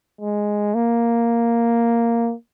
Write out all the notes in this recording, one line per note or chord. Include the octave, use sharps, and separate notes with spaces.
G#3
A#3